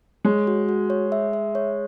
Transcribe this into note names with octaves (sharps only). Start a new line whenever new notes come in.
G#3 C#5
F#4
F#4
C#5
E5
E5
C#5